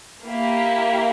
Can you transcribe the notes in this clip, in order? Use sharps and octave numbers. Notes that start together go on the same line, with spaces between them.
A#3 E4 G4